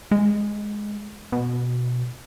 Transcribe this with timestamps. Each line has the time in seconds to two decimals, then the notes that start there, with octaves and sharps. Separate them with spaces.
0.11 G#3
1.32 B2